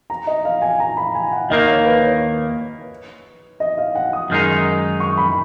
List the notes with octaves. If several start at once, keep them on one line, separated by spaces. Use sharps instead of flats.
A#5
D#5
F5
G#5
A#5
B5
G#5
F#5
D#2 D#3 A#3 D#5
C#5
B4
C#5
D#5
F5
F#5
D#6
F#2 D#3 G#3 D#4
C#6
B5